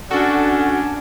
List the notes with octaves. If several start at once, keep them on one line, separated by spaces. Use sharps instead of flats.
C#4 D4 F#4 A4